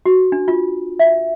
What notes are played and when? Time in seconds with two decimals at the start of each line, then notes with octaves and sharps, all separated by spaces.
0.06 F#4
0.32 D4
0.48 F4
0.99 E5